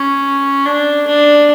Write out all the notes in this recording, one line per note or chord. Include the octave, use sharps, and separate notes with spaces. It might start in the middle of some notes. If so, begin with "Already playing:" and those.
Already playing: C#4
D4
D4